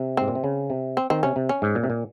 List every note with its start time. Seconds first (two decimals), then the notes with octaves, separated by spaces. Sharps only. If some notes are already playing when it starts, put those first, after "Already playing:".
Already playing: C3
0.17 G#2 C4
0.28 A#2
0.35 C3
0.44 C#3
0.70 C3
0.97 C4
1.10 D#3 C4
1.23 C3 C#4
1.36 C3
1.49 C#4
1.62 G#2
1.75 A#2
1.84 C3
1.90 A#2